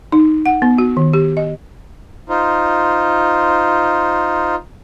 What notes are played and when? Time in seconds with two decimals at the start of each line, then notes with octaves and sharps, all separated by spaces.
0.12 D#4
0.46 F#5
0.62 B3
0.78 F#4
0.97 D#3
1.13 G4
1.37 D#5
2.29 D#4 F4 C5